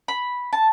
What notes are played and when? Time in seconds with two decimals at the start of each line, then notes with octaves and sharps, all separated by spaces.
0.08 B5
0.53 A5